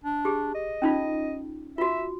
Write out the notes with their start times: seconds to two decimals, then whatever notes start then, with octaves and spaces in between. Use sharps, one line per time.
0.04 D4
0.25 G4 G#4
0.55 D#5
0.82 C#4 D#4 F4
1.78 F4 F#4 E5